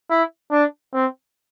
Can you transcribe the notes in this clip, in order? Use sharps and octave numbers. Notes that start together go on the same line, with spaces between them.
E4
D4
C4